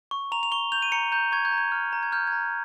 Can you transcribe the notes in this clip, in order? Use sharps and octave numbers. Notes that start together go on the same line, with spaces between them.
C#6
A#5 F7
F7
C#6 G7
G6 F7
D#7
A#5 C#7
A#5 G6
C#6 G#6
G6
A#5
G#6
F6
A#5
G#6
F6 G6
G#6
A#5